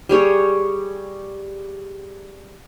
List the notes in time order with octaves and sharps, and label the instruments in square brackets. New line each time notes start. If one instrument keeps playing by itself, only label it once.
[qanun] G3 G#4 C#5